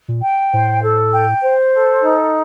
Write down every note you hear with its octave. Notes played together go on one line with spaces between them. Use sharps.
A#2
G5
A2 C5
A4
G5
C5
A4
D#4